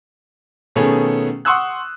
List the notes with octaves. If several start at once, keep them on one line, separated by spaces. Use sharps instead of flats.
B2 D#3 A3 B3 C#4 G#4
F#5 C6 C#6 D#6 E6 F#6